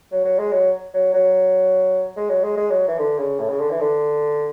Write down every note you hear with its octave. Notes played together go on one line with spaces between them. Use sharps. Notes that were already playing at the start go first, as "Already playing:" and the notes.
F#3
F#3
G#3
F#3
F#3
F#3
G#3
F#3
G#3
G#3
F#3
E3
D3
C#3
A2
C#3
D3
E3
D3